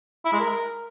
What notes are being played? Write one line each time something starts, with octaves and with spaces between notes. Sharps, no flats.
E4
G#3
A#4